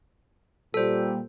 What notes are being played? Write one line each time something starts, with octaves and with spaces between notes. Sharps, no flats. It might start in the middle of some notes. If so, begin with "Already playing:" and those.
A#2 G3 A4 C5